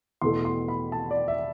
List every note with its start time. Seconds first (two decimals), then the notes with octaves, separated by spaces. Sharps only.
0.22 E2 B2 A3 C6
0.45 C6
0.68 B5
0.92 A5
1.11 D5
1.28 E5